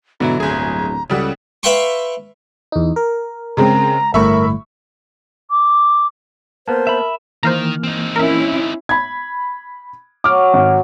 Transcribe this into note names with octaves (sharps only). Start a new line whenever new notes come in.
G#2 B2 D3 F#3 E4 A#5
D1 G1 G#4
C#2 C#3 G3 A4 F#5
B4 E5 F5 G5 C6 C#6
E2 D#4
A#4
C#3 G#3 C4 A#5
G1 A2 A#4 E5 B5 C#6
D6
A#3 B3 A#4 C5 A5
E5 B5
D#3 E3 A#3 C5 F5 A#5 F6
C4 D#4
C#4 E4 A#4 E5
B5 G#6
F#3 F#4 D6 F6
G#1